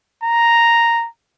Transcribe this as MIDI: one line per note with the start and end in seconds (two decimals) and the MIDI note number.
0.24 1.07 82